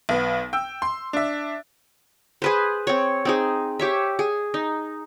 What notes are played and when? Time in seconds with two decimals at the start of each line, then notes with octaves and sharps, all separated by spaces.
0.09 B1 B3
0.53 G5 E6
0.82 C6
1.13 D4 E5
2.42 G#4 B4 C5
2.87 C4 C#5
3.25 C4 D#4 G#4
3.79 G4 C#5 E5
4.19 G#4
4.54 D#4